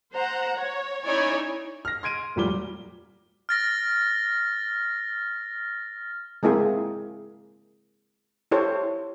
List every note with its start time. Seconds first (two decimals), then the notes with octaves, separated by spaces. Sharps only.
0.12 C5 F#5 A#5
0.57 C#5
1.05 C#4 D#4 E4 C#5 D5 G#5
1.85 F6 A#6
2.03 C6 G#6 D7 D#7
2.36 F1 A#2 F#3 G3 D6 G7
3.49 F6 A6 A#6
6.43 G#3 A#3 C4 E4 G#4
8.51 E4 G4 A4 C5 C#5